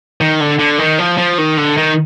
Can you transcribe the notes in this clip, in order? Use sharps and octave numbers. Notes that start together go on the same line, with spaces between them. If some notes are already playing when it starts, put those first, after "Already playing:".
D#3
D3
D3
D#3
F3
F3
D#3
D3
D#3